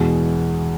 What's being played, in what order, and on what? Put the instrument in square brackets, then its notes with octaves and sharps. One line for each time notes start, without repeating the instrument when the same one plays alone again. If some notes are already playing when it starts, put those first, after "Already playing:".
Already playing: [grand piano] E2 B2 G#3